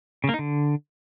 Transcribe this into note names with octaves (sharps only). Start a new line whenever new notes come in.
C#3
A#3
D#4
D3